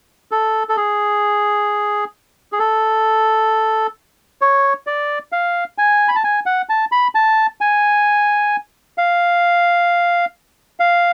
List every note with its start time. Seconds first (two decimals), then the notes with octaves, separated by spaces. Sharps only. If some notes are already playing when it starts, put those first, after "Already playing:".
0.31 A4
0.69 A4
0.77 G#4
2.52 G#4
2.59 A4
4.41 C#5
4.87 D5
5.32 F5
5.78 G#5
6.08 B5
6.15 A5
6.24 G#5
6.46 F#5
6.69 A5
6.92 B5
7.15 A5
7.61 G#5
8.98 F5
10.80 F5